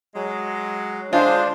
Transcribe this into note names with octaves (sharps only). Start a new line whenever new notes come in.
F#3 G#3
D3 G#3 D4 F4 C5